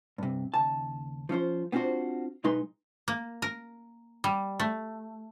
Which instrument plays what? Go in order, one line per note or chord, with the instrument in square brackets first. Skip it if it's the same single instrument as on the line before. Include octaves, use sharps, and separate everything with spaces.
[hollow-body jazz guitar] G2 C3
D#2 C#3 A5
F3 C#4 F4 C5
B3 C4 D4 F4 F#4 C5
B1 G#3 D#4 B4 C6
[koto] A#3
A#4
G3
A3